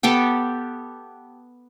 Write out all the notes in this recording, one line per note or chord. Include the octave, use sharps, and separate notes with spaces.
B3 G4 A4 G5